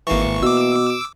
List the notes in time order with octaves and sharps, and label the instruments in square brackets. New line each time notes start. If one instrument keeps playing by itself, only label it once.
[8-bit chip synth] G#1 C#6 [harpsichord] E3 A#3
[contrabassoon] B2 [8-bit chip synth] D6 E6